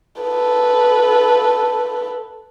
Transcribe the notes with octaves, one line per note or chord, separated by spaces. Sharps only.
A4 B4